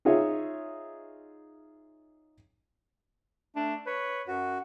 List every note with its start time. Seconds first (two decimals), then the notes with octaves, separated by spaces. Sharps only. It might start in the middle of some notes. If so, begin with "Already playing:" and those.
0.05 D#4 F4 G#4 C#5 E5
3.56 A3 D4
3.86 B4 C#5
4.28 F#2 F#4